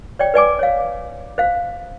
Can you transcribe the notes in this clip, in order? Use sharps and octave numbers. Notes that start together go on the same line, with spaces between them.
C#5 D5 G5
B4 D5 G#5 D6
C#5 F5
C5 F5